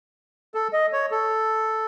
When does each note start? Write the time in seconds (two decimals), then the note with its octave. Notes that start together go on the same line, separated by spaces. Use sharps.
0.54 A4
0.73 D#5
0.93 C#5
1.11 A4